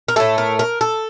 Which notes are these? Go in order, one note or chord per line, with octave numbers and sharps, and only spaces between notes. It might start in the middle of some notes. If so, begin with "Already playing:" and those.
A#4
A2 A3 A4
A#4
A#4
A4